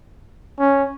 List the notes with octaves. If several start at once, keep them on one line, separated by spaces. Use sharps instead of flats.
C#4